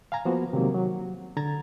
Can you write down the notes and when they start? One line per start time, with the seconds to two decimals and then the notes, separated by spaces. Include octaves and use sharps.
0.12 F5 G#5 A#5 G#6
0.25 F3 A#3 B3 F#4 C5
0.53 C3 D#3 F#3 G#3 A#3
0.74 F#3
1.37 D3 A#5 G#6 A6